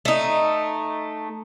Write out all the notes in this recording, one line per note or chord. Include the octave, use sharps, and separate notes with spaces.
A3 D#4